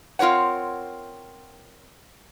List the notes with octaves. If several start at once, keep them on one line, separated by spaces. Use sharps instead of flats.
C4 F4 A#4 C#5 F#5